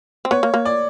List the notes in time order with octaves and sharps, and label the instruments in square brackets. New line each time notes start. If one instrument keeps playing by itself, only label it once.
[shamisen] C4
[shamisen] B3 [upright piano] C#5
[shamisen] A#3
A#3
[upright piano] D5